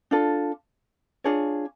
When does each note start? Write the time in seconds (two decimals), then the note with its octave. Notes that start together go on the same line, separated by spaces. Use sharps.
0.11 D4 F4 A4
1.24 D4 F4 G#4 C#5